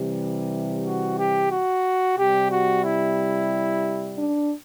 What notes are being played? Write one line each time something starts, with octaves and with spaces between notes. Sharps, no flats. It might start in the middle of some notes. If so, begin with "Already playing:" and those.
Already playing: C3 E3 G3
F#4
G4
F#4
C3 G3 G4
F#4
E4
D4